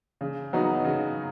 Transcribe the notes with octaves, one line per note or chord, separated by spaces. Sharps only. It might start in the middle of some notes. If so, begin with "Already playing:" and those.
C#3
F#3 B3 D#4 F#4
C#3